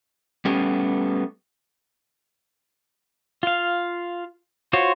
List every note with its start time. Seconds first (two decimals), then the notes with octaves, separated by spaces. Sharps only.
0.45 G3 A3 B3 C#4 G4
3.43 F4 F5
4.73 F4 F#4 C5 C#5